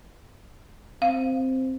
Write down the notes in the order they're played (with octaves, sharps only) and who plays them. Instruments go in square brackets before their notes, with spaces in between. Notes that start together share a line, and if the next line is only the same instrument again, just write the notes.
[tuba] C4 [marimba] F5